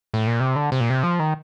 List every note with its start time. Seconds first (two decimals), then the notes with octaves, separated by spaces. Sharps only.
0.14 A2
0.27 A#2
0.40 C3
0.56 D3
0.72 C3
0.80 A#2
0.90 C3
1.03 F3
1.19 D#3